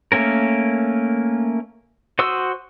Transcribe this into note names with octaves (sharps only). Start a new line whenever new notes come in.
A3 A#3 C#4 A#4
F#4 C5 C6 D#6 E6